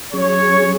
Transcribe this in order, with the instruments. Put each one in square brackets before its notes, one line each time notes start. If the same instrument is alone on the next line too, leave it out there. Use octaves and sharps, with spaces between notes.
[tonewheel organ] F#3 C#4 G#4 [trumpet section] C#5